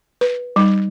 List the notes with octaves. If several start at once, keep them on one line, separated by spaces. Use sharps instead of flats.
B4
G3 D#4